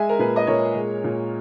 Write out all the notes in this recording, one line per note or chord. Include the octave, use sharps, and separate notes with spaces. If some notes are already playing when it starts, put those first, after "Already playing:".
Already playing: G#3 E5 G#5
A#4
A#2 G#4 B4
D#5
A#2 A#4 C#5
G#3
A#2